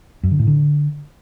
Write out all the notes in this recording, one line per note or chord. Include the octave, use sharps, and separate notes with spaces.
F#2
D3
A2
D3